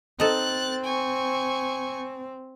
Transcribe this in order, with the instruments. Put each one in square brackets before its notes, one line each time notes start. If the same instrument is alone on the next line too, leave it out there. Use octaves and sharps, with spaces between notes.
[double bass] C4 [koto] D#4 A4 [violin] F#6 A6
[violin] G#5 C#6